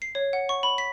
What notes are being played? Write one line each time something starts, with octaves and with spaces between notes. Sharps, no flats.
C7
C#5
F#5
C#6
B5
B6